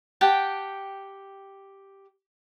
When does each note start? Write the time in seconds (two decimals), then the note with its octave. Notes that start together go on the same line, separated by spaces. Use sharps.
0.21 G4 F#5 G5 A5